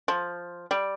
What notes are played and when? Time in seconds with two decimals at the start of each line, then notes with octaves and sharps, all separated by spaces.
0.08 F3
0.71 G3